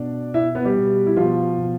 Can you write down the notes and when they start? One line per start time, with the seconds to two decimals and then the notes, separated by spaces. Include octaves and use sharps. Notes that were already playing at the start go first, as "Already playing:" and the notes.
Already playing: B2 D4 D5
0.34 B2 E4 E5
0.55 B3 B4
0.65 G3 G4
0.75 B2
1.07 E4
1.17 B2 F3 F4
1.58 B2